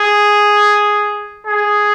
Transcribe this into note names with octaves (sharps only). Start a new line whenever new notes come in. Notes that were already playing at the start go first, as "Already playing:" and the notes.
Already playing: G#4
G#4